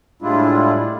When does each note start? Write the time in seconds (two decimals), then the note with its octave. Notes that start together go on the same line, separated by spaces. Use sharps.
0.22 A2 G3 G#3 D4 E4 F4